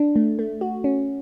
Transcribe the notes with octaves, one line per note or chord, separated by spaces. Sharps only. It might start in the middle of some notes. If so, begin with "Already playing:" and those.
Already playing: D4
A3
A3
F#4
C#4